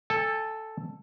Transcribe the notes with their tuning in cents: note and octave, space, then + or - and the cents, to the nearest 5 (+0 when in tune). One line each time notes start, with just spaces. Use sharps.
A4 +0 G#5 -35